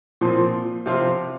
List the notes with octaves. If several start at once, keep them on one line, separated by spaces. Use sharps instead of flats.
A#2 F3 C4
C3 F3 C4 F4